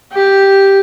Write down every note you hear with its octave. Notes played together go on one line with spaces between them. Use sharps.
G4